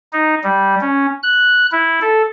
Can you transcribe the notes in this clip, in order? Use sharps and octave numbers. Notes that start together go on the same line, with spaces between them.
D#4
G3
C#4
F#6
E4
A4